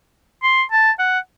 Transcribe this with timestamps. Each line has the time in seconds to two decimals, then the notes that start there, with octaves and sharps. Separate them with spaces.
0.43 C6
0.71 A5
0.99 F#5